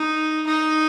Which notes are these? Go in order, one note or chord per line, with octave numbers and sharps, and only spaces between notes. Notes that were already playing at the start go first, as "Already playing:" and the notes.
Already playing: D#4
D#4